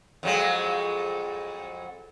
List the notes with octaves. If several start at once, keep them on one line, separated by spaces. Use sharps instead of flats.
F2 F#3 G#3